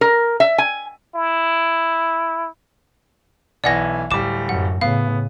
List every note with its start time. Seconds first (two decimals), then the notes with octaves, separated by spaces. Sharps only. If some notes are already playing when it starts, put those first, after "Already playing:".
0.01 A#4
0.40 E5
0.58 G#5
1.15 E4
3.64 B1 E3 D5 F#5 A#6
4.11 D1 G3 D6 E7
4.49 F#2 F#5
4.81 A2 C#3 B3 F5